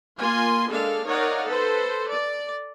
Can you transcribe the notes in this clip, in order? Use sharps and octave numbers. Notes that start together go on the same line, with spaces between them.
A#3 F4 G#5 C6
G#3 A#3 D4 A4 F5
D#4 A#4 C#5 D5 F5 F#5
A4 B4 C5
D5